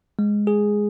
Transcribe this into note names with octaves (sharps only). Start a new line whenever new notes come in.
G#3
G#4